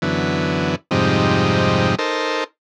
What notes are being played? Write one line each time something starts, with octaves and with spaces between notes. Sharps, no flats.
F#2 D3 E3 B3
F2 G#2 C3 G3 D#4
D#4 A4 A#4 C5